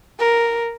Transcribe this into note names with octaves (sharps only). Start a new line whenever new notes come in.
A#4